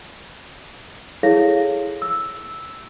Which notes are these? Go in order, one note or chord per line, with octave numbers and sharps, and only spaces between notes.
E4 G#4 A4 C#5 F5 A#6
E6